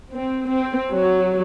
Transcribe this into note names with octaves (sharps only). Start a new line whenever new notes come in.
C4
C4
F#3